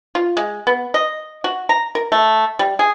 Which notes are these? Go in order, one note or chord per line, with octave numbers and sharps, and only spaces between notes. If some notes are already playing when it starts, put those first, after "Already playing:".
F4
G#3
B3
D#5
F#4
A#5
A#4
A3
G3
G#4